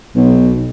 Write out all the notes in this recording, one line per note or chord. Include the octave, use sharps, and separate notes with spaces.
B1